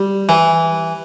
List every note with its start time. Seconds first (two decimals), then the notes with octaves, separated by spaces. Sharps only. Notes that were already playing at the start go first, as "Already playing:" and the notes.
Already playing: G3
0.29 E3